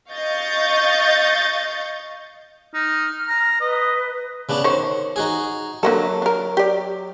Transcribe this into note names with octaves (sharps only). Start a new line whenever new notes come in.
D#5 F5 C#6 G6 A6
D#4 F6
A#5
B4 D#5
C#3 B3 D4
D#3 C5 C#5
D#4 F#4 G#4
D3 F#3 A#3 A4
D4 A#4
G4 D5